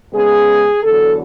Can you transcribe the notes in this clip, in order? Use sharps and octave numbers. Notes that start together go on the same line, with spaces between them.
C#3 G#3 B3 G#4
E2 D3 F#3 A4